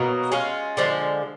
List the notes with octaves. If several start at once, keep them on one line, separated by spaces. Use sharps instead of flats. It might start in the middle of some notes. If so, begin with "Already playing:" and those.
Already playing: B2 F#3 A#3
G#3 C#4 F4
D3 F3 G#3